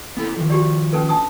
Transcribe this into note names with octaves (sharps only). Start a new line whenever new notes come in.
B3 E4 A4
D#3 F3
F#4 G4 D5
C#4 A4 B4
D4 A5 D#6